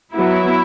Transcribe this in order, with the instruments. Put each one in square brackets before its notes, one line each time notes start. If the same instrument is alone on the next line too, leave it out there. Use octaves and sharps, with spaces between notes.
[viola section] F#3 B3 E4